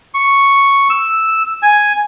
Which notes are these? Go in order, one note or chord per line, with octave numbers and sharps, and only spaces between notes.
C#6
E6
G#5